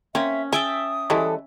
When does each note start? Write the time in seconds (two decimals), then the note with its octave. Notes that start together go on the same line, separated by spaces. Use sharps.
0.15 A#3 C4 C#4 E5
0.53 G#4 E5 G5 A5 D#6
1.10 E3 G3 G#3 C#4 A4